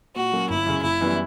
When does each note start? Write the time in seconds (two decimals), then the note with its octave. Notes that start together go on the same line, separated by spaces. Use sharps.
0.16 A#2 F#4
0.32 F#3 A#3 C#4
0.50 G1 E4
0.66 F#2 C#3 F#3
0.83 F#1 E4
1.01 F#2 E3 G3 B3